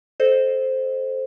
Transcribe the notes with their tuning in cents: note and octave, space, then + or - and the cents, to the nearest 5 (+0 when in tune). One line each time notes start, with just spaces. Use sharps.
A4 -15 C5 +0 D#5 -15